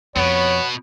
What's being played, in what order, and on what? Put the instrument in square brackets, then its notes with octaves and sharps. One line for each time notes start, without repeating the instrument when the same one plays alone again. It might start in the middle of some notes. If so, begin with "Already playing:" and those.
[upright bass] F2 [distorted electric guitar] B2 [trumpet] B3 [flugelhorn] C#5